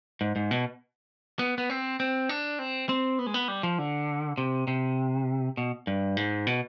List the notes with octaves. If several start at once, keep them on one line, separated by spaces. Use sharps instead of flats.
G#2
G#2
B2
B3
B3
C4
C4
D4
C4
C4
B3
G#3
B3
G3
F3
D3
C3
C3
B2
G2
G#2
B2